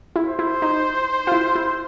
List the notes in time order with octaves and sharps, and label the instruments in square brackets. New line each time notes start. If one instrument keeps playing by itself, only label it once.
[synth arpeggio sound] E4
[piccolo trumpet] C5
[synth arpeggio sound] E4
D#4
F4
E4
E4